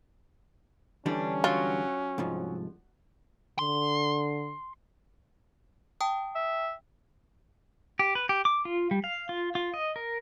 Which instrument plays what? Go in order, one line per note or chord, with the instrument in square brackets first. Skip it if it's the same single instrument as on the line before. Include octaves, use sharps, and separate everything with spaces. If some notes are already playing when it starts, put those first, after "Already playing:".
[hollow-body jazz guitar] D3 E3 G3 [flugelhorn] C#4 [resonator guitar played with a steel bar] D4
[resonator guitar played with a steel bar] F#3 [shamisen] F4
[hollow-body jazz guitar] C2 G#2 F3
[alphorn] D3 [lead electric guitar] C6
[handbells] G5 A5 D#6
[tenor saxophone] E5
[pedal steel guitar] G4
B4
G4
D6
F4
G3
F5
F4
F4
D#5
A#4